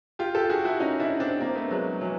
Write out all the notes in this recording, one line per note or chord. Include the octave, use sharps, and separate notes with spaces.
F4 G4
G4 A4
F#4 G#4
E4 F#4
C#4 D#4
D4 E4
C4 D4
A#3 C4
A3 B3
F#3 G#3
E3 F#3